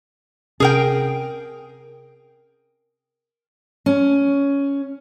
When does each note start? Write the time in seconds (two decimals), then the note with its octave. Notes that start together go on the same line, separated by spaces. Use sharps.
0.60 C3 C#4 G#4 A#4 G5
3.86 C#4